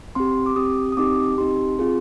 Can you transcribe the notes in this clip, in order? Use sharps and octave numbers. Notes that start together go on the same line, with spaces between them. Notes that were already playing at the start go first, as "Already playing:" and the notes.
C4 G4 C6
D6
C4 G4 D#6
D#6
C4 D#4 G4 D6
C4 D#4 G4 C6
C4 F4 G#4